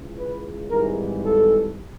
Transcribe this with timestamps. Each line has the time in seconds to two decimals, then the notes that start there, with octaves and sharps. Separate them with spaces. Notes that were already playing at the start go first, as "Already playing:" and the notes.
Already playing: C#2 C#3 E3
0.18 B4
0.69 G#1 G#2 E3 G3 A#4
1.22 A4